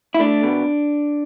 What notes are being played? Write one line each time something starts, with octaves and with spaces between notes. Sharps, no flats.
E4
A3 D4
B2